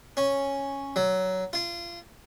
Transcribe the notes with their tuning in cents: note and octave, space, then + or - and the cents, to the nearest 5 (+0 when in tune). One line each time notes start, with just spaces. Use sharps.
C#4 -5
F#3 +15
F4 -25